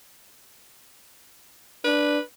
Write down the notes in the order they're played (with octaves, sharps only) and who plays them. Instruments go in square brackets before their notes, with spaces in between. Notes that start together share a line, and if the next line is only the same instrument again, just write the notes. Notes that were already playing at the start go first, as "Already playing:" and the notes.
[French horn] D4 [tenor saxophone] B4